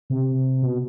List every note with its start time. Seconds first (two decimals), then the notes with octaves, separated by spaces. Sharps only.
0.10 C3
0.62 B2